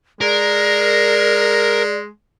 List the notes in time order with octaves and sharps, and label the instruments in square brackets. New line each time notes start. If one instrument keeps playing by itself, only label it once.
[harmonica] G#3 [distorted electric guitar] A#4 [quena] D5